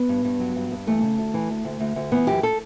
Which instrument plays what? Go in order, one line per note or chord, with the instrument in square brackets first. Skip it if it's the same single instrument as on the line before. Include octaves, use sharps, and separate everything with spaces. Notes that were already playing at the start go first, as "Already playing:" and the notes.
Already playing: [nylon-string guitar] B3
G2
G2
F#3
G2
G2
E3 A3
C#3
D2
E3
D2
D2
D2
D2
E3 B3
F#2 G4
A4